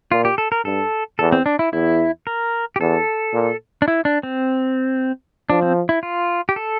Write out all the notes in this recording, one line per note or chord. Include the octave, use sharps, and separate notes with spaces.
A#2 F4
G4
A4
A#4
G2 A4
E2 A4
C4
D4
E4
E2 E4
A#4
G4
E2 A4
A#2
D4
E4
D4
C4
F3 D4
C4
E4
F4
G4
A4